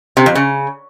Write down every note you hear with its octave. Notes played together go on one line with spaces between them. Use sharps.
C3
F2
C#3